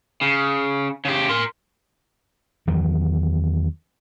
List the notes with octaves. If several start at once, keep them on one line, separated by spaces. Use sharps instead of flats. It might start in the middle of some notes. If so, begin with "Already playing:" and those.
C#3
C#3 G4
A#4 C6
E2 D#3 F#3